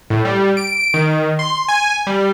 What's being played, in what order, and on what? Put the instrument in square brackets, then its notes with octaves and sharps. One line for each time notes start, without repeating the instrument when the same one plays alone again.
[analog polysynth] A2
G3
D7
D#3
C6
G#5
G3